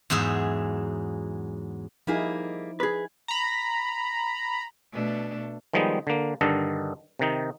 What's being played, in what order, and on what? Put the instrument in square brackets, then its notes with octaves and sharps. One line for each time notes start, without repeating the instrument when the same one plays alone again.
[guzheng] E2 G#2 F#3 G#4 E5
[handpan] F3 D#4 E4 [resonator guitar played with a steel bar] G3 A#3 G#4
[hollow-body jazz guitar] G#4 B4
[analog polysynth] A#5 B5
[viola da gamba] B2 A3 D4
[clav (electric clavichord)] D#3 F3 G3 G#3 B3 D#4
D3 A#3
G2 D3 D#3 A4 D#5
C3 D#3 D#4